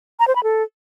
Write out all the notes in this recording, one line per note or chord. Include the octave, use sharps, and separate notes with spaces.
A#5
C5
B5
A4